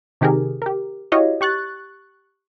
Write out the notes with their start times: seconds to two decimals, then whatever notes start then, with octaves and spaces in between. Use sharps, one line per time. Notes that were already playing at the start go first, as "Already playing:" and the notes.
0.21 C3 D#3 G4 G#4 A#4
0.62 G4 A#4
1.12 E4 F#4 G4 C#5 D#5 F5
1.41 G4 C#6 F#6 A6